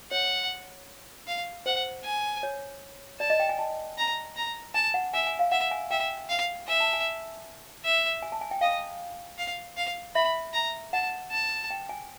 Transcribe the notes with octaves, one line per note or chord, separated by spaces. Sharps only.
C#5 F#5
F5
C5 F#5
G#5
C#5
D5 A5
D#5
G5
G#5
A5
A#5
A#5
G#5 A5
F#5
E5 G#5
G#5
F5
E5 F#5
G#5
E5 G5
F5
E5 G#5
A5
G#5
E5
G#5
A5
G#5
G5
D#5 F5
F5
F5
E5 B5
A#5
F#5 A5
A5
G5
G#5